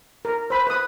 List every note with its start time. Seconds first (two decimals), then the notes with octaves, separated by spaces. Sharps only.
0.25 A#4
0.50 C5 B5
0.67 B4 D#6